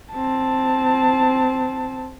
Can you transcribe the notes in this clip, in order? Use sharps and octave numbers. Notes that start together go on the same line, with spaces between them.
C4 A5